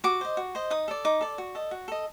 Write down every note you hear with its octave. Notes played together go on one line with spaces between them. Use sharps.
F#4 D6
C5 D#5
F#4
C5 D#5
D#4 D#6
A4 D5
D#4 D6
A4 D5
F#4
A4 D#5
F#4
A4 D#5